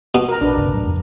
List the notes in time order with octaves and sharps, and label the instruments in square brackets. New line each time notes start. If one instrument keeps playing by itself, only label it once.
[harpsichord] B2
[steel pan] A#4 A#5
[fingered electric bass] A#1 [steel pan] D4 B4
[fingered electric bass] G1 C#2 C3
A2 F#3
F2